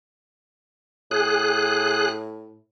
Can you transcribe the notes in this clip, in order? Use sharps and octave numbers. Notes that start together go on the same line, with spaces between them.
A2 G#4 F#6